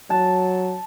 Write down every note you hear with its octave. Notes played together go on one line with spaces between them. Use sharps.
F#3 A5